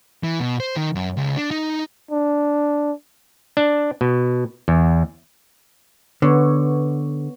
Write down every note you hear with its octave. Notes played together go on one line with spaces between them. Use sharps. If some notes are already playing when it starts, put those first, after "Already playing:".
E3
B2
C5
D#3
F#2
C#2
D4
D#4
D4
D4
B2
E2
D3 B3 C#5